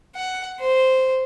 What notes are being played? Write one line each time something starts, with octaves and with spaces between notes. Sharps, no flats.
F#5
C5